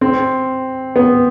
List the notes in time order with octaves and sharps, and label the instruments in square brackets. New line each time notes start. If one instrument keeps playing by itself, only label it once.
[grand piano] C4
B3